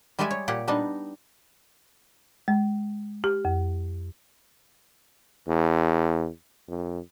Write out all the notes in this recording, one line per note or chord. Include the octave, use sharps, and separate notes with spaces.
G3 G#3 G4 D5 E5 G#5
C#5
A#2 G4 F#5
G3 B3 D4 D#4
G#3
G4
F2
E2
F2